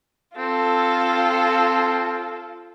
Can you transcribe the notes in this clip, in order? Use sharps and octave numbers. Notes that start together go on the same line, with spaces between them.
C4 F4 A4